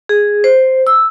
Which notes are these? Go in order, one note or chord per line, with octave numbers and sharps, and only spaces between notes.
G#4
C5
E6